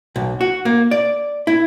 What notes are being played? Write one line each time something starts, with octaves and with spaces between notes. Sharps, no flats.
B1
F#4
A#3
D5
E4